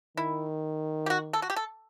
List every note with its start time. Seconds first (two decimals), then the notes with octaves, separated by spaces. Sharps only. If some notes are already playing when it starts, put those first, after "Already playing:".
0.17 D#3 E4
1.06 G4
1.10 F#4
1.33 A4
1.42 F#4
1.50 G4
1.56 A4